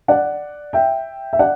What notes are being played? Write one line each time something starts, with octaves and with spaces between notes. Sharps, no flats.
D5 F#5
E5 G5
E5
D5 F#5